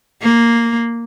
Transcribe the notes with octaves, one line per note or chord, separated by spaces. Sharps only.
A#3